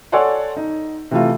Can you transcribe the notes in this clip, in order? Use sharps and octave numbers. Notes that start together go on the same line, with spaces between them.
A4 C#5 D5 F#5 G#5 C6
D#4
C3 E3 A3 F4